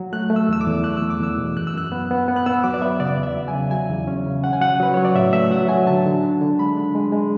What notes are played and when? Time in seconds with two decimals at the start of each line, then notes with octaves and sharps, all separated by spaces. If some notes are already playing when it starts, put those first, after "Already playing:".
Already playing: F#3
0.13 A3 F#6
0.30 A3
0.36 E6
0.49 E2 E6
0.61 D6
0.67 E2
0.84 A3 F#6
0.97 E6
1.02 E2
1.10 D6
1.21 E2 E6
1.38 B2
1.57 F#2 F#6
1.67 E6
1.74 F#2 F#6
1.92 B3
2.11 B3
2.28 B3
2.36 F#6
2.46 B3 E6
2.64 F#3 D6
2.74 D5
2.82 B3 E5
3.00 C#3 D5
3.18 E2
3.23 E5
3.35 F#3
3.48 G#5
3.54 C#3
3.71 F#3 G#5
3.90 E2
4.07 C#4
4.26 C#3
4.44 C#4 F#5
4.53 G#5
4.61 F#3 F#5
4.80 F#3 B4
4.94 F#3 C#5
5.05 D5
5.15 A2 E5
5.33 A3 E5
5.51 F#3 F#5
5.68 F#3 G#5
5.87 D3 A5
6.06 D3
6.23 D4
6.41 D3
6.59 G#3 B5
6.77 D4
6.95 G#3
7.12 G#3